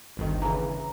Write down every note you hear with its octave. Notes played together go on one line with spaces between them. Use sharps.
G1 D2 D#3
C#3 E3 A#5